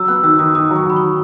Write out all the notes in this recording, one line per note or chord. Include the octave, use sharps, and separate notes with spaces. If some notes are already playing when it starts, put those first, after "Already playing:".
Already playing: F#3 E6
B3 F#6
D#3 E6
D#3 D#6
D#3 D#6
F#3
C#6
F#3 B5
D#3 C#6